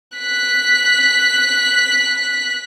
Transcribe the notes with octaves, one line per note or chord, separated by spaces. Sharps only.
F#6 B6